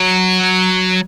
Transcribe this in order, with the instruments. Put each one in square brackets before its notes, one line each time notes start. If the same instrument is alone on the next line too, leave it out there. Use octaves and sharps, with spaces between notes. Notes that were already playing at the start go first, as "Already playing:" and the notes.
Already playing: [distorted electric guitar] F#3